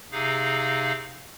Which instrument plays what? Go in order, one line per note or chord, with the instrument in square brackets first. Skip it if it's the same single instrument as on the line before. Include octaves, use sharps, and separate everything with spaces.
[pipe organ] C3 D#4 G#4 F5